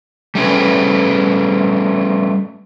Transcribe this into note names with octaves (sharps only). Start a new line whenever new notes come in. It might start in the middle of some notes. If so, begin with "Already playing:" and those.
G3 A3 C#4 B4